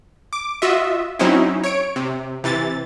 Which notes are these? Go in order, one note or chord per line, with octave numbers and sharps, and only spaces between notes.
D6
F4 F#4 D#5 E5
F#3 C4 C#4 D#4 E4
C#5 D7
C3
C3 E3 A6